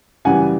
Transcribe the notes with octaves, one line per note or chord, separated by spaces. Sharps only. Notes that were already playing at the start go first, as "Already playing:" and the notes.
F#2 C#3 E3 G3 F#5 G#5